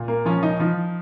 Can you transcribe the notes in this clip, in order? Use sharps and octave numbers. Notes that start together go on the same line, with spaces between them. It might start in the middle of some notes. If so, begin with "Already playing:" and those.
Already playing: A#2
A#3
F3 C#4
D#4
F3 D#4